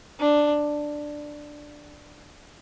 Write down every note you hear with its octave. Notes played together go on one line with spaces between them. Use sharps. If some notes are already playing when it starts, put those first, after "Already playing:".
D4